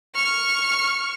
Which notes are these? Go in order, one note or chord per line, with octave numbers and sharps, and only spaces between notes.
C#6 F6